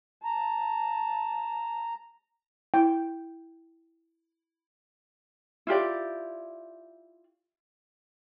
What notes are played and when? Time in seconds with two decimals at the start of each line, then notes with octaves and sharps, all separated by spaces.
0.24 A5 A#5
2.74 E4 G5
5.67 E4 F4 G4 D5